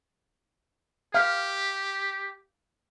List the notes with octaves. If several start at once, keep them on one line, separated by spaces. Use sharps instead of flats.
G4 F5